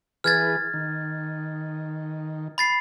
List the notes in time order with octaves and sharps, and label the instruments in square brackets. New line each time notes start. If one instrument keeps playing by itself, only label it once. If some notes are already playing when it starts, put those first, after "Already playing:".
[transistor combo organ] E3 G#4 B4 [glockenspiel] F6 G#6 A6
[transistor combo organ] D#3
[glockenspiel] B5 A6 C7